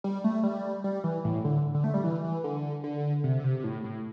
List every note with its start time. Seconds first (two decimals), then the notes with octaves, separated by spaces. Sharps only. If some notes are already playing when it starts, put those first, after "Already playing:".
0.04 G3
0.24 A3
0.44 G3
0.84 G3
1.04 E3
1.25 A2
1.44 D3
1.74 D3
1.84 A3
1.94 G3
2.04 E3
2.24 E3
2.44 D3
2.84 D3
3.24 C3
3.40 D3
3.44 C3
3.60 C3
3.64 A2
3.84 A2